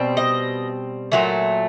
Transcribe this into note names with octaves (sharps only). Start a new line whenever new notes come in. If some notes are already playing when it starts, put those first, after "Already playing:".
Already playing: B2 G3 C4
D#5
A#2 F#3 A3